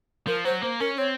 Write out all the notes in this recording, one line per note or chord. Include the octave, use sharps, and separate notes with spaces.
F3 A#4
F#3 C5
A#3 C5
C#4 A#4
C4 C#5